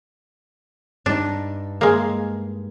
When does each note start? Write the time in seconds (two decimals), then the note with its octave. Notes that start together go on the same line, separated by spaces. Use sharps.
1.06 G2 D4 D#4
1.81 G#3 A#3